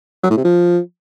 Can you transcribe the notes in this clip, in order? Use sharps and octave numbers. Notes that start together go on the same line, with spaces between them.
F#3
A2
C3
F3